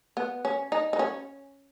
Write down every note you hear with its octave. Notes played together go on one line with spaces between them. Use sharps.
B3
C#4
D#4
D#4
C#4